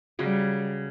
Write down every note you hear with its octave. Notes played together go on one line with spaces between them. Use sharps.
C#3 F#3 G3